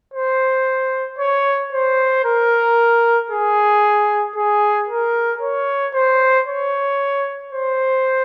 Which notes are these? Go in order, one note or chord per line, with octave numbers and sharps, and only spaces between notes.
C5
C#5
C5
A#4
G#4
G#4
A#4
C#5
C5
C#5
C5